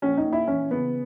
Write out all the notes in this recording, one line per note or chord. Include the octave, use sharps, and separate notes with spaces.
A#1 C#4
D#4
A#2
E4
E3 C#4
C#3 B3